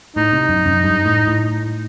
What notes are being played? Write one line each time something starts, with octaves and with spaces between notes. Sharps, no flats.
A2 D#4
C3
F#2
F#2
G2
A2
A2